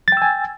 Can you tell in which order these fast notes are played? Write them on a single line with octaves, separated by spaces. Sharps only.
A6 G5 E6 G#5